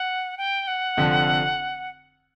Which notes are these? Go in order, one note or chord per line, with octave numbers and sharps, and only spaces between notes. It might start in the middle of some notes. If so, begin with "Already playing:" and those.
Already playing: F#5
G5
F#5
F1 F2 D3 F3